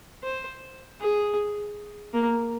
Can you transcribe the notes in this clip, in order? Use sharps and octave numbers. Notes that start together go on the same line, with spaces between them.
C5
G#4
A#3